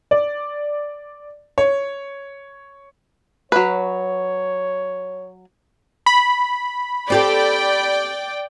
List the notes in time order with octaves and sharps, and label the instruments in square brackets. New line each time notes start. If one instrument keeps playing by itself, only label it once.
[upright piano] D5
C#5
[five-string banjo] F#3 A#3 B4 [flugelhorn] C#5
[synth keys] B5
[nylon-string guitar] C4 G4 A4 [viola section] D5 G5